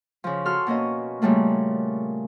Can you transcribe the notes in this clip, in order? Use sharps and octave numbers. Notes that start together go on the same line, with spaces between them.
C#3 F3
F#4 A4 C6 F6
B2 A#3 C#4 D#5
A#2 C#3 G3 A3 A#3